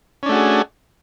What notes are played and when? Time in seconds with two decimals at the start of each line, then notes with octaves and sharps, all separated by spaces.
0.23 C#4
0.26 D4
0.29 A3
0.32 F#4
0.35 G#4